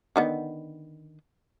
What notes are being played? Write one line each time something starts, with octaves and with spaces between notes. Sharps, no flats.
D3 D#3 B3